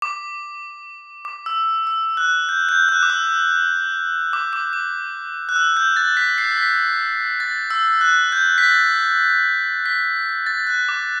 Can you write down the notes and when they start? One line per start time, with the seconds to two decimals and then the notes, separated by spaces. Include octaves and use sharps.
0.02 D6
1.25 D6
1.46 E6
1.87 E6
2.17 F#6
2.49 G6
2.69 G6
2.89 F#6
3.03 D6
3.10 E6
4.33 D6
4.53 D6
4.73 D6
5.49 F#6
5.56 E6
5.77 G6
5.96 A6
6.17 B6
6.38 C7
6.57 B6
7.40 A6
7.70 E6
8.01 F#6
8.32 G6
8.58 B6
8.63 A6
9.86 B6
10.46 A6
10.67 F#6
10.89 D6